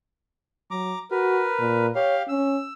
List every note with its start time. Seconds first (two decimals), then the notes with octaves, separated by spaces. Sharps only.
0.71 F#3 A#5 D6
1.11 F#4 A#4 B4
1.59 A#2
1.95 G4 C#5 F5
2.29 C#4 E6